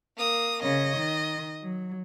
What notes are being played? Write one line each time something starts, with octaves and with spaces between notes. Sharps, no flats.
A#3 D#6
C#3 C#5 D#5
D#3
F#3